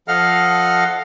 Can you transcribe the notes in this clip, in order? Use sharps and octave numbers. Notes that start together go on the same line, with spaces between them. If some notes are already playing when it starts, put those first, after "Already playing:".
F3 A4 D#5 F5 F#5 F6